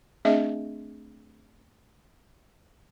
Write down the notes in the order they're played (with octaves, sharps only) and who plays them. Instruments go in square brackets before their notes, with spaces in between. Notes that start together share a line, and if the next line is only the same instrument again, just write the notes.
[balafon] A3 C4 D4 G#4 D#5 E5